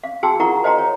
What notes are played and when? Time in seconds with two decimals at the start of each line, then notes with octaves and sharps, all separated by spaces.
0.04 F5
0.23 F#4 G#4 G5 A5 C6 E6
0.40 E4 F4 A#4 F#5 A#5 C#6
0.64 C5 D#5 F5 G5 A#5 C6
0.78 C#5